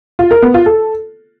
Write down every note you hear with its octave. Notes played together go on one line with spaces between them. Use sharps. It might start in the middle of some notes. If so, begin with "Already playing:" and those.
F4
A#4
B3
F4
A4